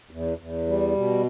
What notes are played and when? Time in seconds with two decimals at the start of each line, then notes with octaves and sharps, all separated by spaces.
0.11 E2
0.38 E2
0.66 G3
0.95 B2